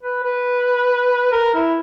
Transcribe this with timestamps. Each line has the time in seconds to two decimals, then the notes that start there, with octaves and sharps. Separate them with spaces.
0.03 B4
0.24 B4
1.32 A#4
1.54 E4